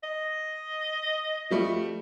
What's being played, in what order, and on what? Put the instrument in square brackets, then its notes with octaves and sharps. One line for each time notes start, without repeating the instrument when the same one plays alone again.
[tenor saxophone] D#5
[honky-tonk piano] F3 G3 A3